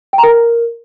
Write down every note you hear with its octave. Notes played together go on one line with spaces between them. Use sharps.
G5
A#5
A#4